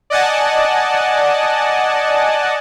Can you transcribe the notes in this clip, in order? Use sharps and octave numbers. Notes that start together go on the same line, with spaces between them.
D5 D#5 F#5 G#5 A5